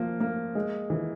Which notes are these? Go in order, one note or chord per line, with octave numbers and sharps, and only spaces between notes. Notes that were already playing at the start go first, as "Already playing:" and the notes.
Already playing: F3 A#3
A#3
G#3
E3